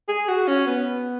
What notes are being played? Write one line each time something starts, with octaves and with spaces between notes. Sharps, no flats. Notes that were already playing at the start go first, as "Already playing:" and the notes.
G#4
F#4
C#4
B3